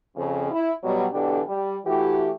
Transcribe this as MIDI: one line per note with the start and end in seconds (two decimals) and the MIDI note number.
0.15 0.50 41
0.15 0.50 49
0.50 0.72 64
0.82 1.05 47
0.82 1.05 54
0.82 1.05 55
1.12 1.40 47
1.12 1.40 50
1.12 1.40 52
1.12 1.40 62
1.12 1.40 67
1.12 1.40 69
1.46 1.75 55
1.85 2.30 52
1.85 2.30 57
1.85 2.30 64
1.85 2.30 66
1.85 2.30 67